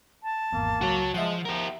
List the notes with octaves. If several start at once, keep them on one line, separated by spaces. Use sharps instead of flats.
A5
G#1 E2 A#3
C#2 F#3 F#4 C#5
F3 G#3 E5 F#5
F3 G4 A#4